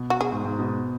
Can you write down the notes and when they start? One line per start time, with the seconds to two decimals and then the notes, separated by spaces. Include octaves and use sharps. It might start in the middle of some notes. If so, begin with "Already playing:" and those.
Already playing: B2
0.10 F#4
0.21 G#4
0.32 G#2
0.45 G#2
0.59 B2